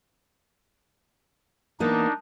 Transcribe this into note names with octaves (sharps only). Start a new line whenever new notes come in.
E3 A#3 B3 D4 D#4